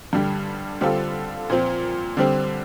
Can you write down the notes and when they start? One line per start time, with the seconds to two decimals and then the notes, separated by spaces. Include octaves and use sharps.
0.13 G2 D3 G3
0.81 D3 G3 C4 F4 A4
1.50 A#2 F3 C4
2.17 D3 G3 C4